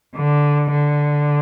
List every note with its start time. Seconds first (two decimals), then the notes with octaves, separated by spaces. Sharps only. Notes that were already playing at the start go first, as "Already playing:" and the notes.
0.16 D3
0.71 D3